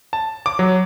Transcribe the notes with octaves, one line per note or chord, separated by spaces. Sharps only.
A5
D6
F#3